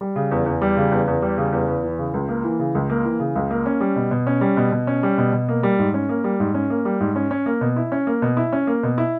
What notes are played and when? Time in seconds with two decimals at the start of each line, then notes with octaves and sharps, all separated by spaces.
0.01 G3
0.16 C#3
0.31 E2
0.46 E2
0.62 G3
0.77 C#3
0.92 E2
1.07 E2
1.22 G3
1.38 C#3
1.53 E2
1.68 E2
1.84 E3
1.99 C#3
2.14 C#2
2.29 A#3
2.44 E3
2.59 C#3
2.75 C#2
2.90 A#3
3.05 E3
3.20 C#3
3.35 C#2
3.51 A#3
3.66 C#4
3.80 G3
3.96 B2
4.11 B2
4.27 C#4
4.41 G3
4.57 B2
4.72 B2
4.87 C#4
5.03 G3
5.18 B2
5.33 B2
5.49 A#3
5.63 G3
5.79 G#2
5.94 C#4
6.09 A#3
6.24 G3
6.40 G#2
6.54 C#4
6.70 A#3
6.85 G3
7.00 G#2
7.16 C#4
7.31 C#4
7.46 A#3
7.61 B2
7.76 E4
7.92 C#4
8.07 A#3
8.22 B2
8.37 E4
8.53 C#4
8.67 A#3
8.83 B2
8.98 E4